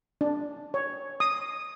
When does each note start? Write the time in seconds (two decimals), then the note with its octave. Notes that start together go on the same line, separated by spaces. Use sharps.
0.21 D4
0.74 C#5
1.20 D#6